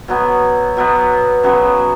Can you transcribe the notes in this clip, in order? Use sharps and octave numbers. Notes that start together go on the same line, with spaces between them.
B2 F#3 B3
B2 F#3 B3
C#3 F#3 B3